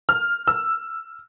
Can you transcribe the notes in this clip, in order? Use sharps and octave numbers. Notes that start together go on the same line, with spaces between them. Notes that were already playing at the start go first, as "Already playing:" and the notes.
F6
E6